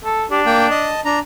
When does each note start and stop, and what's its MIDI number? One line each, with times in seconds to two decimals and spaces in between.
0.05 0.25 69
0.31 0.92 62
0.31 0.41 67
0.46 0.67 58
0.46 0.67 79
0.70 1.01 75
0.70 1.01 81
1.05 1.19 62
1.05 1.19 82